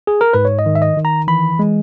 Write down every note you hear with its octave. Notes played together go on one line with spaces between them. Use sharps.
G#4
A#4
G#2 B4
C#5
D#5
D#3
E5
D#5
D#3
A#5
E3 B5
G#3